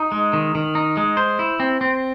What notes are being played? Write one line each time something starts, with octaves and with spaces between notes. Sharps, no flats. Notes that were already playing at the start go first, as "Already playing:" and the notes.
Already playing: D#4
G#3
D#3
D#3
D#4
G#3
C5
E4
C4
C4